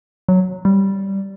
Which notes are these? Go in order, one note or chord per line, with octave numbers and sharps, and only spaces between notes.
F#3
G3